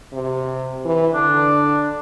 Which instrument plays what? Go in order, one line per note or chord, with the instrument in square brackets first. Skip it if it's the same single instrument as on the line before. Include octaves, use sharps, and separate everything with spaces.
[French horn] C3
E3
[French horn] D3 [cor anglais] D4